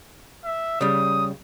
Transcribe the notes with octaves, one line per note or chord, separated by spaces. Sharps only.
E5
C#3 G3 D#6